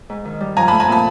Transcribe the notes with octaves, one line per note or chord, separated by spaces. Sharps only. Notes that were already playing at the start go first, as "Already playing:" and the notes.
G#2
D#3
G3
F3 G#5 A#5
A3 A5 B5
G#5 A#5
A#2 A5 B5